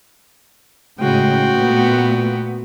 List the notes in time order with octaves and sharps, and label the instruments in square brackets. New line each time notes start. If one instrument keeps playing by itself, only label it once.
[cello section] A2 C#3 G#3 [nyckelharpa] F#4 G5
[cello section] A#2 A3 B3